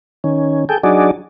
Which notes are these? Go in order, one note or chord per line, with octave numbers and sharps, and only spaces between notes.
D#3 C#4
G#4 A4 G5
F#3 D4 D#4 F#4 G#4 D5